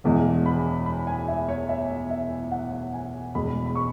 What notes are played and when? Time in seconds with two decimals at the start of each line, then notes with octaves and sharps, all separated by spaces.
0.04 E1 E2 E3 G#3
0.46 B5
0.86 B5
1.07 G#5
1.28 E5
1.48 C#5
1.69 E5
2.11 E5
2.52 F#5
2.94 G#5
3.35 E1 E2 B2 G#3 B5
3.66 B5
3.75 C#6